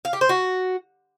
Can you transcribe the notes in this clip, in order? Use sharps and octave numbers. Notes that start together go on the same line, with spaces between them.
F5
G4
C5
F#4